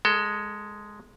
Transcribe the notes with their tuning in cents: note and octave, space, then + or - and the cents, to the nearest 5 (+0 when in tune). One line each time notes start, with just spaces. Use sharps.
G#3 +0 A4 +25